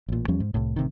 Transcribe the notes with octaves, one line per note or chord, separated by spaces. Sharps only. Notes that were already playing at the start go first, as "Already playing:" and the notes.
A1 A#2
E2 F3 G3 C#4
G#2
C2 A2
A1 C3 D#3